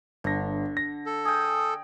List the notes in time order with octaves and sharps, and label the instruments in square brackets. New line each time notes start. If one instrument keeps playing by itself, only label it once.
[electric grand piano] G1 A#6 [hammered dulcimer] D3
[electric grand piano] A#6
[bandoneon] A4
[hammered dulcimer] G#4 G5 [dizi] D#6